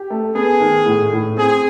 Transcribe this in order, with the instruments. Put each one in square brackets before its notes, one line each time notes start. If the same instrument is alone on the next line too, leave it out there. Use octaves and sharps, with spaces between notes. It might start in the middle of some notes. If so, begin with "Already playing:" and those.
Already playing: [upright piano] G4
A3
[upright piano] B3 [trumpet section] G#4
[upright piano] D#3
A2
A2
[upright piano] C4 [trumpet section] G#4